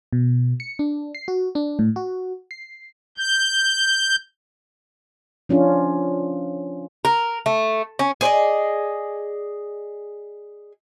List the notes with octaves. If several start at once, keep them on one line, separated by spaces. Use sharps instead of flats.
B2
C#7
D4
C7
F#4
D4
A2
F#4
C7
G6
F3 C#4 D4 F4
A#4
A3
C#4
G#4 C5 D5 D#5